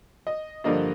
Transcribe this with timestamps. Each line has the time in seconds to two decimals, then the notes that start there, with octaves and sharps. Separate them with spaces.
0.27 D#5
0.64 G2 D3 F3 A#3 D4 D#5